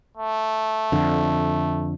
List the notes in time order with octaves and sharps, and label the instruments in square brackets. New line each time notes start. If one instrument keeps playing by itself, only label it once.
[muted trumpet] A3
[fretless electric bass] F2 D3